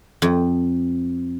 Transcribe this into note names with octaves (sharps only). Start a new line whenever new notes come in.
F2